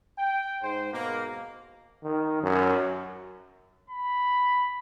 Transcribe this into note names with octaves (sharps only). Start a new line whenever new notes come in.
G5
G#2 C5
G#2 B2 A#3
D#3
F#2
B5